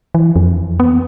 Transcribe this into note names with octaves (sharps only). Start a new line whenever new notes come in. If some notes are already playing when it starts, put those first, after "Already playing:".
E3
F2
B3